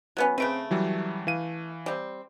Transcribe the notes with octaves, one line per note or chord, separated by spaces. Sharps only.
F#3 B3 C#4
C#3 A3 C4 B4 D7
E3 F#3 G3
E3 F5 D#7
G3 C4